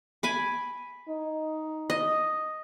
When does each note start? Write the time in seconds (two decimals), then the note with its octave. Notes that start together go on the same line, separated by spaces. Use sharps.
0.23 G#5 B5 D6
1.09 D#4
1.90 D#5